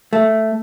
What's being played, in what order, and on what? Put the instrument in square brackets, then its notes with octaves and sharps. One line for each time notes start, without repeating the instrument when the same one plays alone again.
[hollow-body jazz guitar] A3